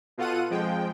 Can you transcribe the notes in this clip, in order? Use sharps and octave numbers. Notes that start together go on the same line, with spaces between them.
B2 F4 A4 F#5 D#7
F2 F3 G#3 G5